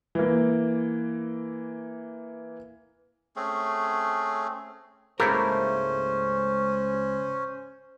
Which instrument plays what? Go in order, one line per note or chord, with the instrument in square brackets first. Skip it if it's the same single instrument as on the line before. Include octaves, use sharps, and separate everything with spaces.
[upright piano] E3 A#3
[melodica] A3 C4 C#4 G#4
[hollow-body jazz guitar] C#2 G#2 A#4 [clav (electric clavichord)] A3 A#3 E4 [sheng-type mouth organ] C#4 [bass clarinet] C5